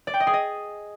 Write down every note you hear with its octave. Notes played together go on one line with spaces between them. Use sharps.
D5
G5
D#5
G#4
D#5